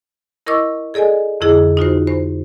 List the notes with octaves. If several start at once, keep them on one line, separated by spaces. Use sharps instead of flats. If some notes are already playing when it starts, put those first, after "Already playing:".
E4 A#4 D#5 C#6 D6 E6
G#4 A4 D5 D#5 G#5
F2 D3 E4 G#4 D#5
D#4 F4 F#4 C5
C5